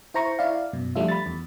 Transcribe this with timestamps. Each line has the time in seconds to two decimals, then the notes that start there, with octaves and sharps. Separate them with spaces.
0.14 E4 C5 A#5 C#6
0.39 E4 D5 F5
0.73 F#2 B2
0.95 F3 G3 A3 D4 F4 E5
1.08 B5 A6
1.26 E2